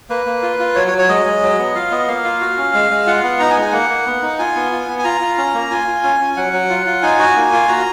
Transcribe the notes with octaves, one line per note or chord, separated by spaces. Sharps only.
A#3 B4
A#3
F4
F4
F#3 C#5
C#5
F#3
C#5
G#3 D#5
G#3
F#3
B3
F4 F5
B3 D#5
A#3 F5
F4
F#4
C#4
G#3
G#3
F4 F#5
B3 F#5
D#4 A#5
G#5
G#3
G#5
A#3 F#5
A#3
B3
D#4
F4 G#5
B3
F4
B3
G#5
F4 A#5
F4
C#4
A#3
F4 G#5
F4
C#4
C#4
F#3 F#5
F#3
F4
F4
D#4 G#5
F#4
A#3
F4
F#4 A#5